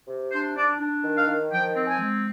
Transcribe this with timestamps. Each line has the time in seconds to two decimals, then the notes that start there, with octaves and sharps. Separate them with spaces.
0.08 C3
0.32 D4 C5
0.56 D4 D5
0.80 D4
1.03 D#3
1.16 F5
1.27 D#3
1.52 F3 G5
1.75 C4
1.87 G#5
1.99 G#3